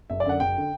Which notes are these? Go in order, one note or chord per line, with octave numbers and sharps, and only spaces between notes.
F#1 E5
D5
F#2 D3 F#5
F#1 G5
D3